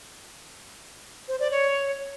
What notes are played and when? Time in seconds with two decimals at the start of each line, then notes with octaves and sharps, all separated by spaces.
1.28 C5
1.40 D5
1.51 C#5